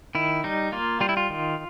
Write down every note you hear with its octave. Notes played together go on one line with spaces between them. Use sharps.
D#3 E4
G3 D#4
A#3 F4
G3 F4
E4
F4
D#3